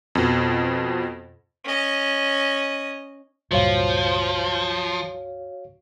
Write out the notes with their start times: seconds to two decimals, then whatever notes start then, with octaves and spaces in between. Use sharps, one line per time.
0.15 F2 B2
1.64 C#4 D#5
3.51 C#2 G2 A#2 F3 F#4 C#5 F5